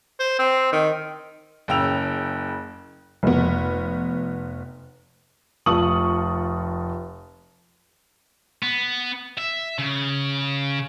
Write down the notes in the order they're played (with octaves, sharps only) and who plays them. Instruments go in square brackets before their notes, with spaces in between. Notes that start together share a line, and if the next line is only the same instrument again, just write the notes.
[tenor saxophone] C5
C4
D#3
[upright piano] F#1 C#3 G5 E6 F7
[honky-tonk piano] F1 B3
F1 F4 A5 C#6 D#6 F#7
[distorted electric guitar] B3
E5
C#3